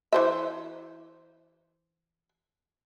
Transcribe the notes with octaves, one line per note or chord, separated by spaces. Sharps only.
E3 C5 E5